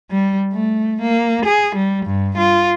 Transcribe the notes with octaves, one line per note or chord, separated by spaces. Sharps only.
G3
A3
A#3
G#4
G3
G2
F4